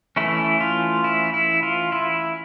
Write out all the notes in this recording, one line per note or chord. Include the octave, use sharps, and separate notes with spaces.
E3 A3 C#4 E4
F4
E4
E4
F4
E4